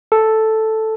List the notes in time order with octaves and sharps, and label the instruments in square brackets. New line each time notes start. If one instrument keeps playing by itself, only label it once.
[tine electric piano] A4